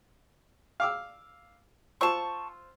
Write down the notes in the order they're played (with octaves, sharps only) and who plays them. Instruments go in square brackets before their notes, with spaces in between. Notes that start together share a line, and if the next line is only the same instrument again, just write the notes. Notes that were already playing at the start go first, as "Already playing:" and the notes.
[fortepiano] F5 D6 E6
[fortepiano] F4 C5 E6 [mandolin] A5 C#6